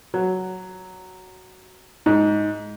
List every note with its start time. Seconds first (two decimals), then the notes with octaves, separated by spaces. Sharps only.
0.14 F#3
2.06 G#2